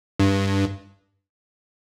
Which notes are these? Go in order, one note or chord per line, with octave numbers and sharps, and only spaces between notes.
G2